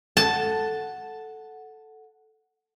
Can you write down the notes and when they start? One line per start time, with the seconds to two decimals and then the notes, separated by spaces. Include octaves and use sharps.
0.17 A4 F#5 A5